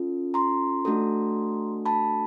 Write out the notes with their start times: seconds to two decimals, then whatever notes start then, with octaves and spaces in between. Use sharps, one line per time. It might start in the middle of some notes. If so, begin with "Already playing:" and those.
Already playing: C#4 F4 A4
0.34 A#5 C6
0.85 A3 D4 F#4 A4
1.85 A5 B5